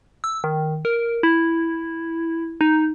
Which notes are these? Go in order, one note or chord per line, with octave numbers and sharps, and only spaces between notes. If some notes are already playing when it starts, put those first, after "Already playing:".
E6
D#3
A#4
E4
D#4